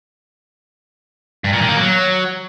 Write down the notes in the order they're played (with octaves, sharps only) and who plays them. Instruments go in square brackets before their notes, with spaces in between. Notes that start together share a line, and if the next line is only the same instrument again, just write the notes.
[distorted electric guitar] G2
A#2
D#3
A#3
F#3